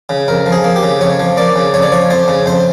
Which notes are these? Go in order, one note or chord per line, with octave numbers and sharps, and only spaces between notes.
C#3
F2 A#4
F3
G#4
A#3
G4
C#3
F2 C#5
F3
A#3 D5
C#3
F2 C#5
D5
F3 C#5
F2 C5
C#3
F2 C5